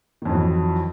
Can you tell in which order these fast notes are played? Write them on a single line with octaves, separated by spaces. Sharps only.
D#3 F2 E3 F#3